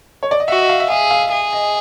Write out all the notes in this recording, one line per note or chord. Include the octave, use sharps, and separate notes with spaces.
C#5
D5
D#5
F#4 E5
D#5
F5
E5
G#4 F5
F5
G#4
D#5